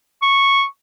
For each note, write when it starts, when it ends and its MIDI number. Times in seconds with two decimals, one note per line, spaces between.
0.22 0.65 85